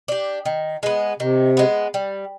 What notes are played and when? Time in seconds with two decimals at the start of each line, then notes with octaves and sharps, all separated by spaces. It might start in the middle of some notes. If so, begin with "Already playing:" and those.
0.08 D4 G4
0.45 D#3
0.83 G#3 B3
1.20 C3 D#3
1.57 G#3 B3
1.94 G3